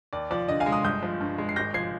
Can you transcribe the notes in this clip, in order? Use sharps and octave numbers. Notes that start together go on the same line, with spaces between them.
D#2 D5
F3 D5
D3 D#5
F5 G#5
G#3
C6 D#6
G1 D#6 G6
F3
G2
G#3
C7
G#1 G6 A#6
F3 G#6 C7